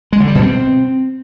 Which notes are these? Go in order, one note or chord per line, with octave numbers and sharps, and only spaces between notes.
G#3
D3
G3
B2
C4